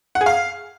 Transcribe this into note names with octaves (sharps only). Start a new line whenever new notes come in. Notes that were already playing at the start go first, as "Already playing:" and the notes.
F#5
G#4
F5